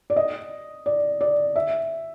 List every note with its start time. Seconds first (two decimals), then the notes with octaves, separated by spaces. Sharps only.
0.10 D5
0.16 D#5
0.86 D5
1.21 D5
1.56 E5